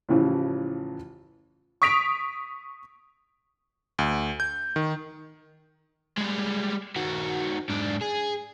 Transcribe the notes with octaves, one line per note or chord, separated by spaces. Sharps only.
A1 A2 C#3 E3 F3
C#6 D#6 B6 D7 F7
D2
G6
D#3
G3 G#3
D#3 F#4
G#2 D4
G#4